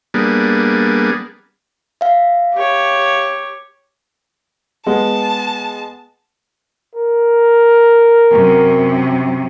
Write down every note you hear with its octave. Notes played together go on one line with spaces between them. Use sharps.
G3 A#3 B3 D4 G#4
E5 F5
G4 C#5
G#3 B3 A5
A#4
F#2 C3